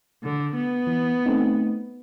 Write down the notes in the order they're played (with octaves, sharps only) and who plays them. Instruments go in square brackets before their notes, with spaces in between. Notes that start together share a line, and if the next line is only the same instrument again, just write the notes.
[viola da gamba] D3
B3
[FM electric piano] E3
A3 C4 D#4